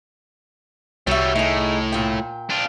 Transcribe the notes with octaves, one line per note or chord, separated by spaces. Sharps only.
C2 F#3 G3 C#5 E5
A2 D#4 G#4
A#2 G5
D4 F4